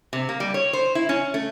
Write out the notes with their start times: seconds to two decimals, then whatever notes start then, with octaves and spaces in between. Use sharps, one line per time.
0.13 C3
0.29 A#3
0.40 G3
0.54 C#5
0.73 C5
0.95 E4
1.09 C#4
1.34 A3